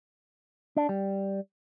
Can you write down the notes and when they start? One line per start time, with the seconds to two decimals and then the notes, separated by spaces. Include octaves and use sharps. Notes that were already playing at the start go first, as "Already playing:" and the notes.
0.77 D4
0.89 G3